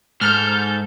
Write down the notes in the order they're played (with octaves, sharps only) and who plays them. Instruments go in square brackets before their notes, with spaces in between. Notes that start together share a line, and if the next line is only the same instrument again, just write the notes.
[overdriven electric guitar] G#2 [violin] A4 G6 [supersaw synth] F6